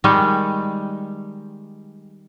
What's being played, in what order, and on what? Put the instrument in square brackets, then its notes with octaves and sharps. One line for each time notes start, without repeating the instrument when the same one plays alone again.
[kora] D#3 G3 G#3